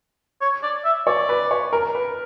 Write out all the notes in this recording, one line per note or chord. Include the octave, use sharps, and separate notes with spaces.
C#5
D5
E5
C#5 D5
B4
C#5
A#4
B4